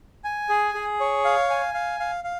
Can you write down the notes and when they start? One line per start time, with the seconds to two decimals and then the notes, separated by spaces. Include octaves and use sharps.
0.24 G#5
0.49 G#4
0.74 G#4
1.00 C#5
1.25 F5
1.50 G#5
1.74 F5
2.00 F5
2.24 F5